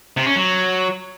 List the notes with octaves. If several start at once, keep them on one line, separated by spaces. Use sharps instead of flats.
C3
C#4
F#3